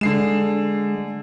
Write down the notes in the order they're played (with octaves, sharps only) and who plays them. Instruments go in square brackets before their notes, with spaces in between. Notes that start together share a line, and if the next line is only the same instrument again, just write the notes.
[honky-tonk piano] D3 C7 E7 [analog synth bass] G#3